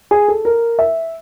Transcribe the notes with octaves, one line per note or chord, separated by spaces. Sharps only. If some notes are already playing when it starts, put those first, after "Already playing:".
G#4
A4
A#4
E5